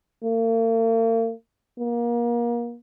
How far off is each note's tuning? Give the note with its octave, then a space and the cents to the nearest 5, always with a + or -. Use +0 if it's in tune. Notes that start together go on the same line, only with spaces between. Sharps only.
A#3 -45
A#3 +30